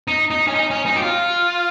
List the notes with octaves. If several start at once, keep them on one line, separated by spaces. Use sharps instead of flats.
D#4
D#4
C#4
D#4
C#4
D#4
G4
F4